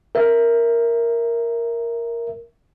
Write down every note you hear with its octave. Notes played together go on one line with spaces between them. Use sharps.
A#4 E5